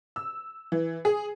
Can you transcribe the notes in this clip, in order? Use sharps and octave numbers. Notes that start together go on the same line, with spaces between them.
E6
E3
G#4